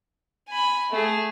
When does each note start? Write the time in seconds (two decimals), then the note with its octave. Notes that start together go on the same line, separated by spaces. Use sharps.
0.48 G#5 B5
0.91 A3 G#4